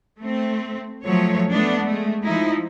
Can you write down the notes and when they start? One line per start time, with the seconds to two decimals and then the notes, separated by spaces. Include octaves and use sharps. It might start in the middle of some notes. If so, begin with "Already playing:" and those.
0.19 A3 C4
1.04 F3 F#3 A3 C#5
1.51 A3 B3 D4
1.85 G#3 A3
2.23 F3 D#4 E4